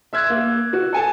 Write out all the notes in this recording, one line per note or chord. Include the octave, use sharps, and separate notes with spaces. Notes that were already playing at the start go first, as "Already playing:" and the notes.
E5 C6 E6 F#6 G#6
A#3
F#4
A4 G#5 A5